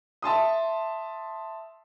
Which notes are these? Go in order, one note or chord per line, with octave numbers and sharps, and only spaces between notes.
E5 A5 C6 D#6